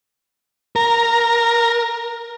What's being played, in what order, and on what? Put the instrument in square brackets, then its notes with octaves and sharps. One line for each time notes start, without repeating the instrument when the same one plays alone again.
[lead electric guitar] A#4 [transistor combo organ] A#5